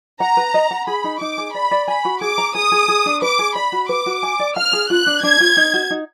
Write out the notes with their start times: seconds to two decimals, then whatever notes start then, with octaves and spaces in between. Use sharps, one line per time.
0.20 F#5 A#5
0.37 B4
0.54 D#5
0.71 F#5
0.87 G#4 B5
1.04 D#4
1.21 D#4 D6
1.38 G#4
1.54 D5 B5
1.71 D5
1.88 G#5 B5
2.05 F#4
2.21 G#4 D6
2.38 A#5
2.55 G#4 D#6
2.72 G#4
2.88 G#4
3.06 D4
3.22 B4 D6
3.39 G#4
3.56 D5 B5
3.72 F#4
3.89 B4 D6
4.06 F#4
4.23 G#5
4.40 D5
4.56 F5 F6
4.73 G#4
4.90 F4 F#6
5.06 D4
5.23 D4 G#6
5.40 F4
5.57 D#4
5.74 F#4
5.91 D#4